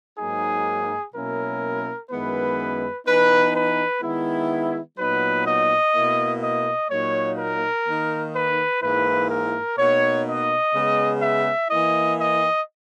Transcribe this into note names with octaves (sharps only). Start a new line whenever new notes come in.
G#2 F#3 A#3 D#4 G#4
B2 F#3 A#3 C#4 E4 A#4
F#2 D#3 G#3 B3 E4 B4
E3 B3 D#4 B4
B4
D#3 G#3 B3 E4
A#2 F#3 B3 D#4 B4
D#5
B2 A#3 E4
D#5
A#2 F#3 A#3 D#4 C#5
A#4
D#3 A#3 D#4
B4
G#2 E3 A#3 E4 B4
A#4
B2 A#3 D#4 C#5
D#5
C#3 G#3 B3
E5
E3 A#3 E4 D#5
D#5